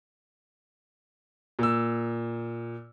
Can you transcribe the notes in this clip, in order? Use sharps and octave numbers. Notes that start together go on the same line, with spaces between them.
A#2 E6